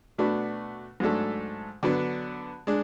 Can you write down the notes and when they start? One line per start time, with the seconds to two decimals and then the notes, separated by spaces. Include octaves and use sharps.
0.18 B2 A3 D4 F#4 B4
1.00 G#2 F#3 A3 D4 A4
1.83 D3 F#3 B3 D4
2.67 G#3 D4